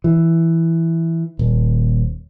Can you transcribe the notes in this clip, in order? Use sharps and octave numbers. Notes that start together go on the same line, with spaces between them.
E3
D#1